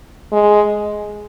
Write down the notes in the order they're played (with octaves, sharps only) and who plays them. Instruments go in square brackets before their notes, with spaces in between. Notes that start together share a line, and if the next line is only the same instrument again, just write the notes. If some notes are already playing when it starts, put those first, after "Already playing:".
[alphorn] G#3